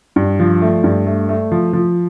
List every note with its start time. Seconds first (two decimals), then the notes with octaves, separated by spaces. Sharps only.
0.16 G2
0.40 F3
0.62 A3
0.84 G2
1.06 A3
1.29 A3
1.52 F3
1.73 F3